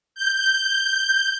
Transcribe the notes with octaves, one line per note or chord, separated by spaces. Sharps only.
G6